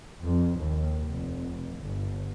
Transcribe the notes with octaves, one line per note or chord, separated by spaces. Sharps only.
F2
D#2
F1
G1